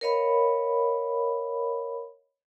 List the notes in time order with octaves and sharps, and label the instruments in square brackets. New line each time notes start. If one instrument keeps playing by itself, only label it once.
[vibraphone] A#4 B4 C#5 D#5 F5 B5